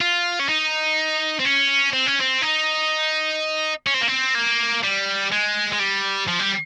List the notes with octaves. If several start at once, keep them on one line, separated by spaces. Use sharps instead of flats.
F4
C#4
D#4
C4
C#4
C4
C#4
C4
D#4
C#4
C4
A#3
C4
A#3
G3
G#3
G#3
G3
F3
G3